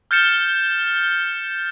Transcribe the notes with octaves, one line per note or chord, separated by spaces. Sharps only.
F6 G6 A6 C#7 E7 G7